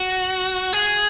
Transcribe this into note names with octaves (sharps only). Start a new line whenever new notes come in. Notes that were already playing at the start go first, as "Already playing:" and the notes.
Already playing: F#4
G#4